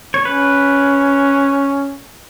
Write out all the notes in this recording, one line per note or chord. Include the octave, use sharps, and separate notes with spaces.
C#5
C#4 B4